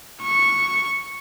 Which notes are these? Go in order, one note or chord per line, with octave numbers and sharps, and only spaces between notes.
C#6